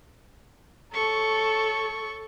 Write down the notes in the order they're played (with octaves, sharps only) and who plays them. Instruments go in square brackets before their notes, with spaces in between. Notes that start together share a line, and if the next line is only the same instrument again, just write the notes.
[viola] A4 [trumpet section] C#5 A5 [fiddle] C#6